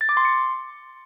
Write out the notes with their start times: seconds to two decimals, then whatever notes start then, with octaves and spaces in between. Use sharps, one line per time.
0.01 A6
0.09 D6
0.17 C6
0.25 C#7